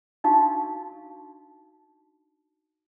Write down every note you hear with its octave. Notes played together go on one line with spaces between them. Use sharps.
D4 D#4 F#4 F5 A5 C#6